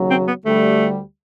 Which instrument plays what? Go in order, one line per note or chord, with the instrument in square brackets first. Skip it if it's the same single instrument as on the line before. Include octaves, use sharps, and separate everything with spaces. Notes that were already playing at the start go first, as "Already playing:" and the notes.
Already playing: [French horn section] D#2 C#3 F#3
[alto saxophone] C4
B3
[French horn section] D2 D3 G3 [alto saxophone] A3